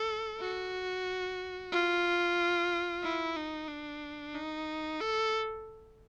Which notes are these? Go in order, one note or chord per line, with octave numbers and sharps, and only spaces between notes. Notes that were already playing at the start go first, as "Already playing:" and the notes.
Already playing: A4
F#4
F4
E4
D#4
D4
D#4
A4